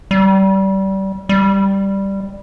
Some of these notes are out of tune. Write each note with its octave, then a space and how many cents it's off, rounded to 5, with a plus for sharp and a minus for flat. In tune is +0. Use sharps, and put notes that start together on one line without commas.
G3 -25
G3 +0